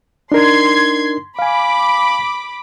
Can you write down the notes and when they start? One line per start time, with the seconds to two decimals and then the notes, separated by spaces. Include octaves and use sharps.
0.32 D4 D#4 A#4 C6 G#6 C7
1.39 F5 G#5 B5 D6